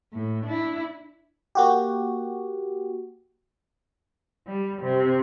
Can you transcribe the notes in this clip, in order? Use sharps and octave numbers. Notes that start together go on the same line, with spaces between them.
A2
D4 E4
A#3 F#4 G4
G3
C3